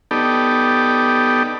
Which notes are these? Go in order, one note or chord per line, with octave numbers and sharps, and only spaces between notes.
B3 D#4 G4 A4 D5